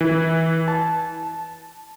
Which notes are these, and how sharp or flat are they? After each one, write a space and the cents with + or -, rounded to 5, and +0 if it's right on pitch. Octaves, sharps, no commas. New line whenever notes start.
E3 -20
A5 -20
A5 -5